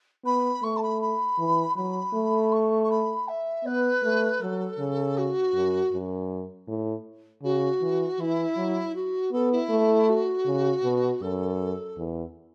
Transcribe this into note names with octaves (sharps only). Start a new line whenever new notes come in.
B3 B5
A3 C#6
A5
B5
B5
E3
F#3 B5
A3
C#6
C#6
B5
E5
B3 B4
A3
F#3 A4
C#3
F#4
F#2
F#2
A2
C#3 F#4
E3
E3 E4
F#3
F#4
B3 A4
E4
A3
F#4
C#3
B2
F#2 A4
E2